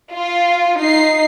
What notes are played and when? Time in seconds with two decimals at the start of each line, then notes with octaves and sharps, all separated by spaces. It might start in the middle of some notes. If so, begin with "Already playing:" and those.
0.14 F4
0.79 D#4 C7